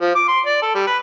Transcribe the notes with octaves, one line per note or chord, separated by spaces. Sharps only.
F3
D6
C6
D5
A4
G3
B4